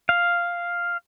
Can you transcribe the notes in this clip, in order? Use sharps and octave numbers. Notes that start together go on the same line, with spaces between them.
F5